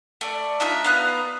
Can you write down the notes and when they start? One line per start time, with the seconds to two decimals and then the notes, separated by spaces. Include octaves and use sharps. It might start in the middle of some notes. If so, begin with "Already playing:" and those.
0.21 A3 D5
0.60 D4 D#4 F4 E5
0.84 B3 F5 A#5 F#6